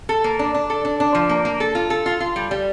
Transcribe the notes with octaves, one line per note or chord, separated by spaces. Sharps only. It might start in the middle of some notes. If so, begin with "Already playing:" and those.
A4
A#3
D4
D4
A4
D4
D4
F3
A#3
A#3
A4
F4
A4
F4
F4
G3
G3